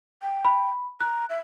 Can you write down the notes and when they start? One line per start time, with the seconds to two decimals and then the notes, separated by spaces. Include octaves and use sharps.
0.22 G5
0.45 B5
1.01 A#5 F#6
1.30 E5